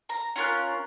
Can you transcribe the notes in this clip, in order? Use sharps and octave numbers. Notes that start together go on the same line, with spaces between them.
A#5
C#4 F4 A#4 F#6